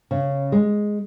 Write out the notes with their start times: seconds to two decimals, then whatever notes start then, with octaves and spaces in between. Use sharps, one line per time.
0.11 C#3
0.52 G#3